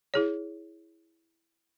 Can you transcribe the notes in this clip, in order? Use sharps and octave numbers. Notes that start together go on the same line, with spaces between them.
E4 G#4 C#5